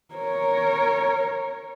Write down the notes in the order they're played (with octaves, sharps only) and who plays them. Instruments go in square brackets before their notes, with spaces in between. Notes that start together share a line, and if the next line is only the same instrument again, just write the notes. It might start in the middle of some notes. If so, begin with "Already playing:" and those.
[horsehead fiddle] A#4 C#5